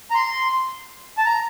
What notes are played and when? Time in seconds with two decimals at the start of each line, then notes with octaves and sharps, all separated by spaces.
0.11 A#5
0.15 C6
1.18 A5
1.25 A#5